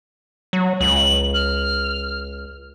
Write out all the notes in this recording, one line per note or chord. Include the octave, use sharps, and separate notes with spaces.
F#3
C#2 F#7
F6